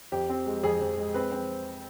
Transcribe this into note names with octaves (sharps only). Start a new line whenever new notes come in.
F2 G4
C4
G#3
F2 G#4
F2
G#3
C4 B4
C4